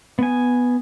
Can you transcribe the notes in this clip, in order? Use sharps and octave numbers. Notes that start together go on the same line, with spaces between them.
B3 G#5